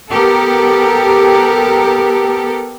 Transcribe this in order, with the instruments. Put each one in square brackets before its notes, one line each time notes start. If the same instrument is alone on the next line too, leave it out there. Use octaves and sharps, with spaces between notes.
[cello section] B3 G4 A4 A#4